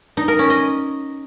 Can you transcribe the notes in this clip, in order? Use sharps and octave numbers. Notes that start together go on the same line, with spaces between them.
D#4
A#4
C#4
D#5